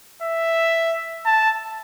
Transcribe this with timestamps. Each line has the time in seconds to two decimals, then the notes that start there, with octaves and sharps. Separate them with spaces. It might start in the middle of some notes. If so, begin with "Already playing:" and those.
0.23 E5
1.26 A5